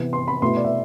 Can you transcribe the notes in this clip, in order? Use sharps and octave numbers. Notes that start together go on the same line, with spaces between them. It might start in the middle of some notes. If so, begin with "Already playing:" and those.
Already playing: C3 E3 B3
C6
B5
B2 A3 E4 C6
D5
E5